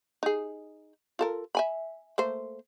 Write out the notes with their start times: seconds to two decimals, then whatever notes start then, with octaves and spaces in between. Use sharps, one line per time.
0.23 D#4 G#4
1.19 F4 A4 A#4
1.55 E5 G#5 B5
2.18 A3 A#3 C5